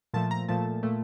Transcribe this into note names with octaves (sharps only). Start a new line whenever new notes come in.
A#2 F3 A3 A5
A#5
A#2 F3 A3 A5
A#2 A3